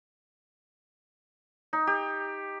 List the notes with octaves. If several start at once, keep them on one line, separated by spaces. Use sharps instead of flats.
D#4
G4